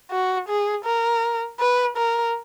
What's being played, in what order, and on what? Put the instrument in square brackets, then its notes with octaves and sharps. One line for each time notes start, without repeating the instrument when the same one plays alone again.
[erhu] F#4
G#4
A#4
B4
A#4